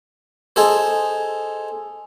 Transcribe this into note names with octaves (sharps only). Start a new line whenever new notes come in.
D#4 G#4 A4 C5